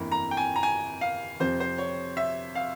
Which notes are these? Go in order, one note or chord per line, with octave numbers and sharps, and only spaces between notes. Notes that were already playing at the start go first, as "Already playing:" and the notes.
Already playing: G1 F2 E3 A#3 E4
A#5
G5
G#5
A#5
G#5
F5
F2 C3 F3 C5
C5
C#5
E5
F5